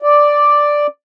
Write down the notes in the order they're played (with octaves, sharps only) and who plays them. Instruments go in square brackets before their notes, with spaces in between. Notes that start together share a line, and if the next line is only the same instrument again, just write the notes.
[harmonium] D5